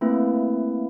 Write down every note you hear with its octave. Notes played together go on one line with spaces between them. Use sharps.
A3 A#3 C4 E4 B4